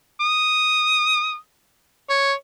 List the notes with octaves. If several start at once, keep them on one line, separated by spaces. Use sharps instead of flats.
D#6
C#5